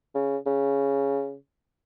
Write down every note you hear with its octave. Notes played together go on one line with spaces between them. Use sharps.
C#3
C#3